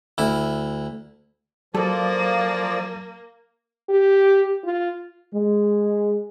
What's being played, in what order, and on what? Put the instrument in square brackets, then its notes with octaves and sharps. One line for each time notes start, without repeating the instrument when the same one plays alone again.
[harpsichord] D2 E4
[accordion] F3 D5 [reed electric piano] F#3 [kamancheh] A#3 [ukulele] A4
[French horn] G4
F4
[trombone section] G#3